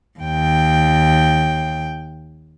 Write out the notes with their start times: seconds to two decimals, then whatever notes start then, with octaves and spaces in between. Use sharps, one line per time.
0.19 D#2 G5